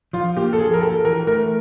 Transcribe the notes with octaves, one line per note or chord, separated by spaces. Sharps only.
F3 F4
A#3 G4
A4
F3 G#4
A#4
G4 A4
E3 A#4
A3 A#4